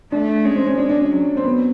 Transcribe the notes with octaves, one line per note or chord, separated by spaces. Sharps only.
A3 D4
G#3 C#4
C4
C#4
G#3 D4
D4
C#4
F#3
C4
B3